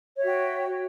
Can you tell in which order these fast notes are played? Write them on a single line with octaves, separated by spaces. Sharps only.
C#5 E5 F#4 G5